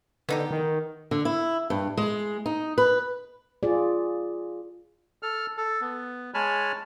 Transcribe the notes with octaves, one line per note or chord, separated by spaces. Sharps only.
D3 B3 D#4 G4
D#3
D3
E4
G2
G#3
D#4
B4
F4 G#4 D5
A4 F6
A4
B3
G#3 C#5 G#5 A5 B5 F6